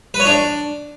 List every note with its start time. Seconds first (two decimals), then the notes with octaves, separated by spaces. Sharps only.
0.14 B4
0.20 C#5
0.25 D4